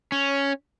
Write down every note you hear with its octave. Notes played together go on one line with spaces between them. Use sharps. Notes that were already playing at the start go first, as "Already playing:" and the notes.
C#4